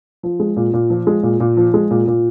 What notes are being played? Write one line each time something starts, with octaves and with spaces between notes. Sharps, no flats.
F3
G#3
A#2
A#2
F3
G#3
A#2
A#2
F3
G#3
A#2
A#2